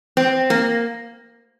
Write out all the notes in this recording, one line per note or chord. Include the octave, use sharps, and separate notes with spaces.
C4
A#3